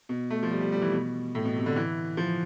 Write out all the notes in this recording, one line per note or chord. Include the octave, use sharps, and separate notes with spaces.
B2
A3
F3
G3
G3
G3
E3
B2
A2
B2
C3
D3
E3
F3